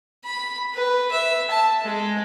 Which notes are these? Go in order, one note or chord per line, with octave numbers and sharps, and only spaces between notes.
B5
B4
E5
A5
G#3